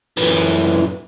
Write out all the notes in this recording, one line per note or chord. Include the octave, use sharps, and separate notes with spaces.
F#2 E3